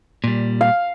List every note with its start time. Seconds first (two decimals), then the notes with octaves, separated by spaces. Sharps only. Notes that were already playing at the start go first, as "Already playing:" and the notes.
0.24 A#2 G3
0.61 F5